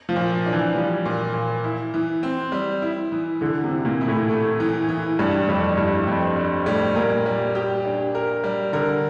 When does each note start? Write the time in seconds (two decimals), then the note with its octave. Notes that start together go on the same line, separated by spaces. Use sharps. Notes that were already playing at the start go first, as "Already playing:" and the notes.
0.09 F3
0.16 A#2
0.46 D4
0.53 E3
0.75 F3 G3
1.05 A#2
1.34 A#2
1.64 E4
1.94 E3
2.23 C4
2.52 G3
2.82 E4
3.12 E3
3.41 D3 E3
3.64 C3
3.71 E3
3.85 A#2
4.01 E4
4.08 A2
4.29 A3
4.60 E3
4.88 E3
5.19 G2 G3
5.48 F2 G3
5.77 G2 E4
6.07 F2 C4
6.36 G3
6.66 A2 G3
6.95 A#2 A#4
7.26 G3
7.55 G4
7.85 D4
8.15 A#4
8.44 G3
8.73 D3 A#4